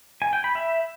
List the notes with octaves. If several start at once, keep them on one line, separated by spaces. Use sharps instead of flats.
G#5
G5
B5
E5